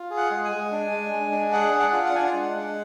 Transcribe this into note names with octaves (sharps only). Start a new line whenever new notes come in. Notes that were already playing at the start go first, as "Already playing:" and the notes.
Already playing: F4
G#4
F#5
G#3
G#5
G#3
D4
G#3
G#3
D4
G#4 F#5
D4
F#5
F4
F#5
D4 G#5
F#5
G#3
G#3